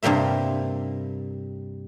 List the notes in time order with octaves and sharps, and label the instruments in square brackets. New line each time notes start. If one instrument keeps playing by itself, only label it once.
[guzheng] G2 C3 G3 A#3 E5